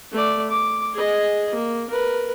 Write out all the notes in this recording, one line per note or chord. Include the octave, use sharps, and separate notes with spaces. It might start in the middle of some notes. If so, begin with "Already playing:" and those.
A3 D5
D6
G#4 D#5
A#3
A#4 B4